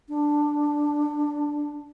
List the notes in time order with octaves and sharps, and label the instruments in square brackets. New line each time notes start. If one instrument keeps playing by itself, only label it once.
[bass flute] D4